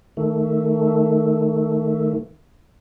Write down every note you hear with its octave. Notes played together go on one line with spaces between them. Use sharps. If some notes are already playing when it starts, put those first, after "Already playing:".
D#3 A3